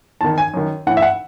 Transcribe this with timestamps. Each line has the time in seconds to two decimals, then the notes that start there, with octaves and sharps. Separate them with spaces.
0.21 E2 D#3 A5
0.38 G#5
0.54 F#2 D#3
0.87 A2 E3 F#5
0.97 E5
1.02 F#5